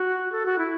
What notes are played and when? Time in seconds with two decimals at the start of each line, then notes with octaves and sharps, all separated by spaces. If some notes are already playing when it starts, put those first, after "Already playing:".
Already playing: F#4
0.32 A4
0.46 F#4
0.58 E4